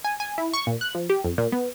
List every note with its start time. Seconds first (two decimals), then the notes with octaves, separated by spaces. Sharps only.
0.04 G#5
0.20 G#5
0.38 E4
0.54 C#6
0.67 A#2
0.81 F#6
0.95 F3
1.10 G4
1.24 F2
1.38 A#2
1.52 B3